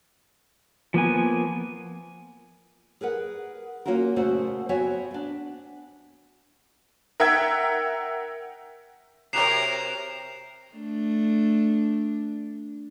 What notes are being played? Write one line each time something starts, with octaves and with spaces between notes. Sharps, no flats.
F3 A#3 B3 G#5
G#4 A#4 B4 F#5
A#3 C#4 F4 F#4 A#4
A#2 C#3 A3 F#4 C5 F#5
B3 C4 F#4 C#5 E5 G#5
B3 D4
A#4 E5 F#5 G5 E6 G#6
C3 F#4 G4 A#4 C#5 C7 E7 F7
A3 D4